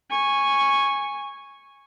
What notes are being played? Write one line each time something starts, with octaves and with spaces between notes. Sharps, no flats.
G#5 C#6